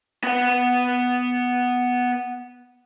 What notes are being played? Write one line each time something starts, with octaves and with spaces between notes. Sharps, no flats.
B3 F#5